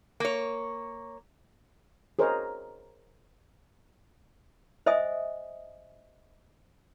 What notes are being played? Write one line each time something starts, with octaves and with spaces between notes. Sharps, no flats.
A#3 C#5
G#4 A#4 C5 C#5 D#5 A#5
C5 D#5 E5 G#5 D#6